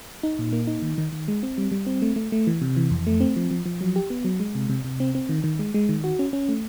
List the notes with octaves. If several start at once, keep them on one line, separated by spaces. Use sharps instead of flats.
D#4
A#2
A#3
D#4
D#3
D#3
D#3
G#3
C4
G3
G3
C4
A3
A3
A3
E3
C3
E3
F2
A3
C4
F3
F3
F3
F#3
G4
B3
F#3
G#3
C3
C3
C3
C4
C4
D#3
D#3
G#3
G#3
D#3
F#4
C#4
C#4
A3